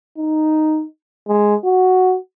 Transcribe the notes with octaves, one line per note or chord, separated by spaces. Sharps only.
D#4
G#3
F#4